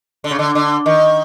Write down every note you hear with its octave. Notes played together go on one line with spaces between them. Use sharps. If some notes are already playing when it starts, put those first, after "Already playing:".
D3
C#3
D3
D3
D#3